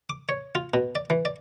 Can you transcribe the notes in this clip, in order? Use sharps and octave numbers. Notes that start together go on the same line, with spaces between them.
D6
C#5
F4
B2
D5
E3
D5